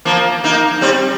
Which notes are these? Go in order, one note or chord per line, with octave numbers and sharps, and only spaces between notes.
F3 A#3
A#3 D#4
G3 C4